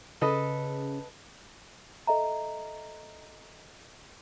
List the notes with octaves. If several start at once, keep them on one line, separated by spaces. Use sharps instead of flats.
C#3 A4 B4 D#5
A4 D#5 E5 A#5